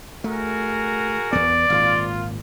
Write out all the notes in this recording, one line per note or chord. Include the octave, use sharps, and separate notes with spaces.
A3 F#4 G#4 A#4
E2 B3 D5
G#1 A#2 F4